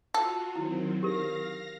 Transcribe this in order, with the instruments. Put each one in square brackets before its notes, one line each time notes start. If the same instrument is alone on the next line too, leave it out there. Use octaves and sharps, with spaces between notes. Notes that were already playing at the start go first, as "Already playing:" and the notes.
[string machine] F4 F#4 [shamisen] A4
[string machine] D#3 F#3 C4 [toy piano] E4
[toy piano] G4 A#4 [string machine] F5 A#6